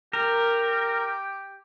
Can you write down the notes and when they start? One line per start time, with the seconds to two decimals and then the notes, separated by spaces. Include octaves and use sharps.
0.13 G4 A#4